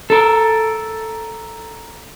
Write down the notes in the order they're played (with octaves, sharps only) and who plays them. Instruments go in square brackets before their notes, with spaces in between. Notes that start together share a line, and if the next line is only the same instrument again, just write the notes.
[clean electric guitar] A4 A#4